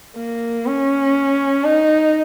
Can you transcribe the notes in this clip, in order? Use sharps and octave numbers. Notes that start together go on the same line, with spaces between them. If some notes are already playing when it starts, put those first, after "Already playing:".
A#3
C#4
D#4